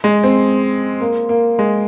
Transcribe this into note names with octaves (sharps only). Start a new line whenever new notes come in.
G#3
C4
A#3
A#3
G#3